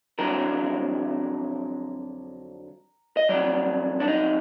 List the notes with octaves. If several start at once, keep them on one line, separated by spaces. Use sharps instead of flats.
F2 D3 F#3 A#4
D#5
F2 D#3 F#3 D5
D4
D#4